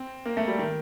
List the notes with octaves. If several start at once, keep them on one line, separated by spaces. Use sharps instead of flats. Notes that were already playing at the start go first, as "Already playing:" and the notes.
Already playing: C4
A#3
A3
G3
D#3